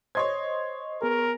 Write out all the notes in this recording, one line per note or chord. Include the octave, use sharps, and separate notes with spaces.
C5 C#5 D#5 C6 G#6
B3 G#4 A#4